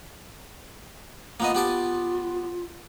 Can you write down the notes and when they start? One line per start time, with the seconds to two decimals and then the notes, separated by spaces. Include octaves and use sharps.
1.40 A#3 B3 F4 D#5
1.55 B3 G4 A5